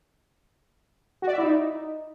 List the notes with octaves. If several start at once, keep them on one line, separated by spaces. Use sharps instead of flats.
F#4
D5
E5
E4
D#4